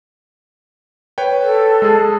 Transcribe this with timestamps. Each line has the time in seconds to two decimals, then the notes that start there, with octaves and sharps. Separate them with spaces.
1.18 B4 C#5 G5
1.42 A4
1.82 G#3 G#4